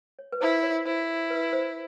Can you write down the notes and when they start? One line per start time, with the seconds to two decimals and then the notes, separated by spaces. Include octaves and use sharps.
0.19 C#5
0.32 B4
0.41 E4 C5
0.63 C#5
0.85 E4 C5
1.30 B4
1.53 C5